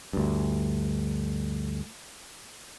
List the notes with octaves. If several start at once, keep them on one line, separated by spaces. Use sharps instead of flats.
D2 G2